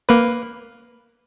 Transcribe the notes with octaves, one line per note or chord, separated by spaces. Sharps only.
A#3 B4